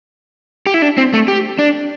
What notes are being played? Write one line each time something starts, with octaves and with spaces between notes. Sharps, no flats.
G4
E4
D4
C4
A3
G4
D4